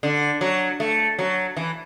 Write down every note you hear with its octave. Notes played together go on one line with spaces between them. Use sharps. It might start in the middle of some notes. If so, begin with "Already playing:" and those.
D3
F#3
A3
F#3
E3